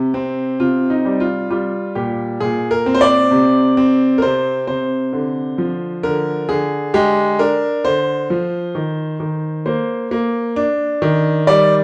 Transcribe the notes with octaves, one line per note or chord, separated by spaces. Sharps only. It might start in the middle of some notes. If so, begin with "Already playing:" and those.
Already playing: C3
C4
C3 F4
D#4
G3
F4
G3 F4
A#2 G4
A#2 G#4
A#4
C4
C5
D5
C3
C4
A#4
C3 C5
C3 C5
D3
F3
D3 A#4
D3 G#4
G#3 G4
D4 A#4
D3 C5
F3
D#3
D#3
A#3 C5
A#3
D4
D#3
G3 D5